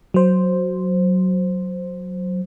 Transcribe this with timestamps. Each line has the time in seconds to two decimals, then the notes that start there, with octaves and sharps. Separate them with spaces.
0.14 F#3 C5